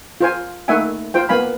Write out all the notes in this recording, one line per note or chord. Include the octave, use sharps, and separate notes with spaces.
F4 C5 G#5
A3 A#3 D#4 E5 F#5 G#5
F4 C5 G5
A#3 B3 F5 G#5 B5